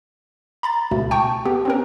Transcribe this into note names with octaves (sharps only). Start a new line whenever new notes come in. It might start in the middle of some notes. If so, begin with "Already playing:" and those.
A#5 B5 A6
C#2 B2 A3
G5 A5 C#6
B3 G4
C4 C#4 A#4